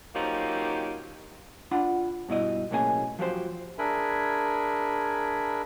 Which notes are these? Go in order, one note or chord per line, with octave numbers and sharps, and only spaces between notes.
F3 F#3 A#3 C#4 D#4 G4
D4 F4 F#5 B5
G2 B2 E4 D#5
B1 A2 A#3 C#4 G#4 G#5
F3 F#3 G4 C5
D4 G#4 A#4 E5 G#5 B5